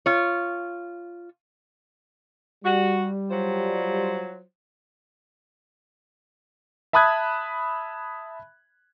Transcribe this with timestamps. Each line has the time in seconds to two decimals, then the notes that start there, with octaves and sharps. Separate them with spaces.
0.06 F4 C#5
2.65 G3 F#4
3.30 F#3 F4 C5
6.93 E5 A5 B5 D#6 F#6 G#6